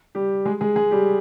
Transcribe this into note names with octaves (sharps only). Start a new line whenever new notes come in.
G3 G4
G#3 G#4
G#3 G#4
G#3 G#4
G3 G4